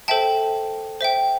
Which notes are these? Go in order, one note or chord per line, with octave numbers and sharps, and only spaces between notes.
A4 C5 E5 G5 A5
C5 E5 G5